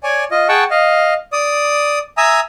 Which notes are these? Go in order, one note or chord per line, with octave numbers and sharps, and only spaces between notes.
C#5 D5 G#5
F4 D#5
G#4 F#5 G5 A5 C#6
D#5 F5
D5 D#6
E5 G#5 A#5 D#6 E6